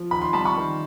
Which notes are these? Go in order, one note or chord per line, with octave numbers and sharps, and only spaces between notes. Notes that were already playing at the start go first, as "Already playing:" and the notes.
Already playing: F3
D#3 B5
C6
G3 A5 B5
B5 C#6
D#3